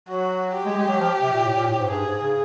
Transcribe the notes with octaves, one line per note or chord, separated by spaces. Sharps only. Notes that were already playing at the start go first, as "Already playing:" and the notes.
F#3 F#4
G4
G#3
G#3
F#3
F3
C3
A#2
A2
A#2
A2
G#2
G2 G#4
G#2
C#3